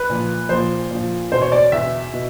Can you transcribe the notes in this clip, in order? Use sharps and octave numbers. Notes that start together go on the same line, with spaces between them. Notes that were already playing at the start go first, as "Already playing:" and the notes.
Already playing: B4
A#2 F3
A#2 F3 C5
A#2 F3
E2 B2 C5
C#5
D5
E2 B2 E5
B2